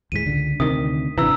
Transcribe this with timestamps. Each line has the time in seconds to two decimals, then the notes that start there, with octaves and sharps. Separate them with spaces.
0.12 D#2 A2 G#3 B6 D#7
0.26 C#2 D3
0.60 D2 C3 D#3 D#6
1.18 G#1 C3 E3 D4 A#5 E6